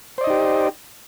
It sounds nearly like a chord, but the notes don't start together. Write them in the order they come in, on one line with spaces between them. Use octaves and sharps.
C5 D5 D#5 D#4 G4